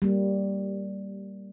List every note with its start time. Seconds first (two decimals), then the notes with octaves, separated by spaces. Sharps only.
0.02 G3 A#3